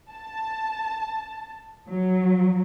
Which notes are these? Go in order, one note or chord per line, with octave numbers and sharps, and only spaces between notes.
A5
F#3